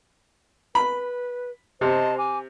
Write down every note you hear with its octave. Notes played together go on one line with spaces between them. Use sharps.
B4 B5
C3 C5 D#5 A5
G#5 D6